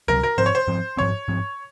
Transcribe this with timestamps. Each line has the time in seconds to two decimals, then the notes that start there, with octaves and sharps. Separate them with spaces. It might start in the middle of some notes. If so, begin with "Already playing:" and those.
0.08 C#2 C3 F#3 A#4
0.23 A#4
0.38 G#2 F3 C4 C5
0.46 C#5
0.55 C5
0.67 G#2 F3 C4
0.97 G#2 F3 C4 C#5
1.28 G#2 F3 C4